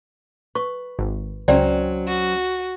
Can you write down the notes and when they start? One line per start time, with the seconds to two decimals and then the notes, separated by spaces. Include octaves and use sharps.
0.55 B4 C#6
0.99 G#1
1.48 C#2 F#3 C4 C#4 D5 G5
2.08 F#4